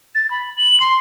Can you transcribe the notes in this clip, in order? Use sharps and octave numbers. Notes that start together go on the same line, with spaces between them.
A6
B5
F#7
C6